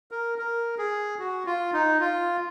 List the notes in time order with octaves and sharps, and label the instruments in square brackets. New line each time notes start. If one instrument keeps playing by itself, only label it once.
[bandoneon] A#4
A#4
G#4
F#4
F4
D#4
F4